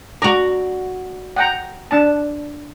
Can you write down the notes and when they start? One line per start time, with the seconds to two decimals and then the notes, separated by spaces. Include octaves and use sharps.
0.22 F#4 D5 A#5
1.36 F#5 G5 A#5
1.91 D4 A5